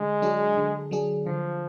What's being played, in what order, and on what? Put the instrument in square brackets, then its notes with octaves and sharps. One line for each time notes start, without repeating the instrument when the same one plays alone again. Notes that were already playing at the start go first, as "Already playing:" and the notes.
Already playing: [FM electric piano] D3 [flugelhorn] G#3
[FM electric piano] F#3 D4 G#4
D3
F#3 D4 G#4
[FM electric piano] D3 [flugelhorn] F3